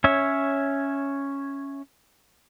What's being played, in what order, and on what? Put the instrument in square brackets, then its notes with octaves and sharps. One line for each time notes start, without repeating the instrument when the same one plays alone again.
[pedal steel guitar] C#4 C#5 E5